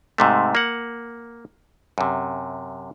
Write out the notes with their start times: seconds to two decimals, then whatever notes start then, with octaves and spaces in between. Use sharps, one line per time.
0.18 G#2 C3 A3
0.55 A#3 F#5
1.98 F#2 C3